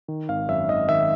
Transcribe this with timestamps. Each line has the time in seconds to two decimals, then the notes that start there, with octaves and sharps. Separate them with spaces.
0.08 D#3
0.29 G#1 F5
0.48 F#2 E5
0.69 G#1 D#5
0.89 D#3 E5